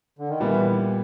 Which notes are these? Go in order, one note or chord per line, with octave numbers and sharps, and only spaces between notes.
D3
D#3
A#2 E3 G3 B3